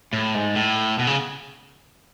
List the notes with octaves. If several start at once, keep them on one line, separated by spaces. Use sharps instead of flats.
A2
G#2
A2
B2
C#3